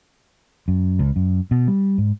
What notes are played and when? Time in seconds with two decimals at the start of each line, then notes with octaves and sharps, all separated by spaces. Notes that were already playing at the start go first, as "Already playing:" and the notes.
0.68 F#2
0.99 C#2
1.16 F#2
1.51 B2
1.68 G3
1.98 G#2